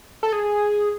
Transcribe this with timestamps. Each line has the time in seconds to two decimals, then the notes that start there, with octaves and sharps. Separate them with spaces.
0.23 A4
0.33 G#4